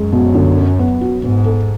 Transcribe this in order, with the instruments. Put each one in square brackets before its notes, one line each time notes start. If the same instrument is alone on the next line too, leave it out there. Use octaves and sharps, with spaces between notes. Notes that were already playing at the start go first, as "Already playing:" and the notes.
Already playing: [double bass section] F#2 [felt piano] G#3
[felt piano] B2
D3
C#4
B3
F#4
[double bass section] G#2 [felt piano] B3
[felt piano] A4